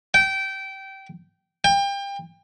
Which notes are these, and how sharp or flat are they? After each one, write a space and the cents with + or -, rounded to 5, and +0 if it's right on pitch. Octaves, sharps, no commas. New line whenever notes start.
G5 -20
G5 +30